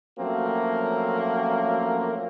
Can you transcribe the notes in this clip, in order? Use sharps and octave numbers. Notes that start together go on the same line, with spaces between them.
F3 F#3 A3 A#3 C4 C#4